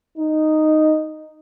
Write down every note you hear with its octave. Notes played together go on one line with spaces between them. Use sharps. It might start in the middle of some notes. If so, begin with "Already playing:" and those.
D#4